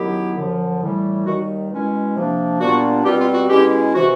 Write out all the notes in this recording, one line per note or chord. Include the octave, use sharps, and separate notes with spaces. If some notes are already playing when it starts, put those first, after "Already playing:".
Already playing: F#2 D#3 F#3 B3 E4 G4
F#2 D3 F3
A2 E3 G3
D#2 D#3 G3 F#4
B2 G#3 C#4 E4
C3 F3 A#3 D4
A#2 G3 B3 D4 F4 F#4
B2 G3 C4 F4 G4
F4
F#4
B2 G#3 C#4 E4 G4
C3 E3 F#4